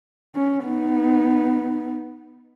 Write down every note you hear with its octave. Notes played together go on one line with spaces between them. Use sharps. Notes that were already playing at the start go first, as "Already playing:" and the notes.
C#4
B3 D#4